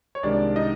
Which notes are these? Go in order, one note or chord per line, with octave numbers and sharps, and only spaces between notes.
C#5
C2 C3 D#3 G#3 D4 D5
D#4 D#5